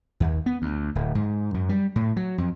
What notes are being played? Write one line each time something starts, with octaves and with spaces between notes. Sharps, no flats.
D#2
B3
D2
D1
G#2
F#2
G3
A2
F#3
F2